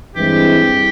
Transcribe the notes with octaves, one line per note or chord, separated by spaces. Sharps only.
G2 E3 G#3 C4 E4 G4